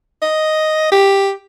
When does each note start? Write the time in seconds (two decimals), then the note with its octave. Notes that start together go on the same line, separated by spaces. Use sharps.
0.22 D#5
0.92 G4